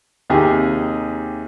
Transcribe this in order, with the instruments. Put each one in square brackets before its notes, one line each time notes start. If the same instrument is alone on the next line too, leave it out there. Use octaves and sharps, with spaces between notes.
[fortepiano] D#2 C3 D#4 G4 G#4